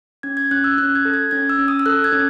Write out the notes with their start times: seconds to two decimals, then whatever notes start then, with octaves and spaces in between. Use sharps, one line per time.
0.23 C#4 G#6
0.37 G#6
0.51 C#4 F#6
0.64 E6
0.78 C#4 F#6
0.95 G#6
1.05 A4
1.14 G#6
1.31 C#4 G#6
1.49 E6
1.59 C#4
1.68 D#6
1.79 E6
1.86 A4 F#6
2.04 G#6
2.12 C#4